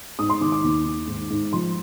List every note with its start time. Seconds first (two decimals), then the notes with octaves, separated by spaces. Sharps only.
0.19 G#2 D#6
0.30 C6
0.41 D#3 D6
0.52 D6
0.64 D#2
0.85 D#3
1.08 G#2
1.30 G#2
1.53 F3 C6